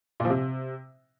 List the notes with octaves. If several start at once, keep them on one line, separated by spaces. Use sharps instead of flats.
A#2
F3
C3